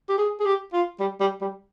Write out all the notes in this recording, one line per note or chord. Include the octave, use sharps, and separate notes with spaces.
G4
G#4
G#4
G4
F4
G3
G3
G3